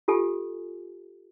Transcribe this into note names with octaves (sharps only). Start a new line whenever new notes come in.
F4 G4 A4 G#5